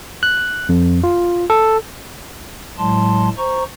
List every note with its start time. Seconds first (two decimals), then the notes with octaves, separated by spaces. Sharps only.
0.23 F#6
0.69 F2
1.04 F4
1.50 A4
2.78 A2 F#3 G#3 A5 C6
3.37 C5 A#5 C#6